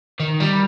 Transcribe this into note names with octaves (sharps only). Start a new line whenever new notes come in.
D#3
G3